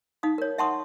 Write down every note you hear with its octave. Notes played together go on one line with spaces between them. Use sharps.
D#4 F5 D#6
A#4 C#5
E5 F#5 A5 C6 C#6 D#6